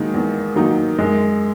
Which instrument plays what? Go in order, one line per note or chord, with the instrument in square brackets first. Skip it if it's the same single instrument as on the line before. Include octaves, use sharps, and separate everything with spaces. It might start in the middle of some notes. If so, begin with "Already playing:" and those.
Already playing: [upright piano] D#3 F#3 A#3 D#4 [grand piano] G#3
[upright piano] E2
D#3 F#3 A#3 D#4
[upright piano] F#2 [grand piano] G#3